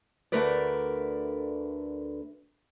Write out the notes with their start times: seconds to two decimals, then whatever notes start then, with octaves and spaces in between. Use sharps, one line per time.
0.32 D2 D3 A3 A#4 B4 D5